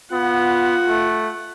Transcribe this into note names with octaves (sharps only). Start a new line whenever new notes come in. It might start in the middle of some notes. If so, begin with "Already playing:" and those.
B3 F4 F#5
A3